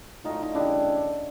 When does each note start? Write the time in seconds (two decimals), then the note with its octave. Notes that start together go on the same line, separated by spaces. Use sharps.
0.24 A2 F#3 A3 D#4 F4
0.43 D#4
0.54 C#3 E3 G3 D4 E4